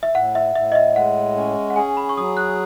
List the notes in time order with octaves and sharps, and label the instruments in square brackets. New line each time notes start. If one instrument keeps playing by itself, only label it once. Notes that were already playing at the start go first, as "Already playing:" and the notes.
[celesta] E5
[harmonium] A2 [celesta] F#5
[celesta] E5
[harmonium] A2 [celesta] E5
[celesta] D#5
E5
[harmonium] G#3 [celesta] F#5
[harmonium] C#4
[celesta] F#5
[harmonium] G#4 [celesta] G#5
[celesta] B5
C#6
[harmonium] F#3 [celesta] D#6
[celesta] F#6